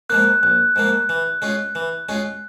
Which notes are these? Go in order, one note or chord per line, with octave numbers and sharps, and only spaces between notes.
G#2 F3 A#3 F#6
A#1 F#6
G#2 F3 A#3
E3
G#3 C#4 F4
E3
G#3 C#4 F4